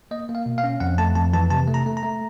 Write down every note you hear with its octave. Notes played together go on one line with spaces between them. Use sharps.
A#3 D#5
A#3
F5
B2
F5
C#4
F2 F#5
A3 A5
F2 A5
E3 A5
C3 A5
A3
A#5
A3
A#5
A3